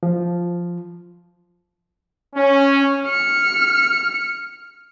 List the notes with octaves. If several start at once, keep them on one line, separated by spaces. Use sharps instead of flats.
F3
C#4
F6 C#7